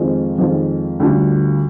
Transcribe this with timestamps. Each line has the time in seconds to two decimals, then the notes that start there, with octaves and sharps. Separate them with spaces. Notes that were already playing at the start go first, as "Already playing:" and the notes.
Already playing: F2 D#3 G#3 C4 F4
0.38 F2 D#3 G#3 C4 F4
1.00 D2 D3 G3 D4 F4